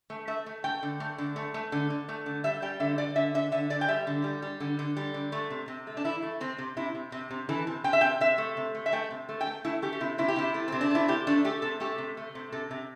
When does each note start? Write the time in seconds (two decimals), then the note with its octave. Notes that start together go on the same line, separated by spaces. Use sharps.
0.10 A3
0.27 A3 E5
0.46 A3
0.64 A3 G5
0.83 D3
1.00 A3
1.18 D3
1.36 A3
1.54 A3
1.72 D3
1.90 D3
2.09 A3
2.26 D3
2.44 G3 E5
2.62 G3 G5
2.80 D3 E5
2.98 D3 D5
3.16 D3 E5
3.34 D3 E5
3.52 D3 E5
3.70 D3 D5
3.81 G5
3.88 G3 E5
4.07 D3
4.24 G3
4.42 G3
4.60 D3
4.79 D3
4.97 G3
5.14 D3
5.32 A3
5.50 C3
5.68 C3
5.87 A3
5.97 D4
6.05 E3 E4
6.23 A3
6.41 C3 C4
6.58 C3
6.77 C3 E4
6.95 C3
7.12 C3
7.31 C3
7.49 E3 A4
7.67 C3
7.84 C3 G5
7.93 E5
8.01 C3 G5
8.21 C3 E5
8.38 A3
8.57 C3
8.75 A3
8.86 E5
8.93 A3 G5
9.11 C3
9.29 A3
9.41 G5
9.47 A3
9.65 A3 E4
9.82 A3 G4
9.93 G4
10.00 C3 E4
10.18 C3 E4
10.28 G4
10.36 C3 E4
10.54 A3
10.68 C3 C4
10.81 D4
10.91 A3 E4
11.08 C3 G4
11.27 A3 D4
11.45 A3 G4
11.62 C3 A4
11.80 A3 G4
11.98 C3
12.17 A3
12.35 C3
12.52 C3 A4
12.71 C3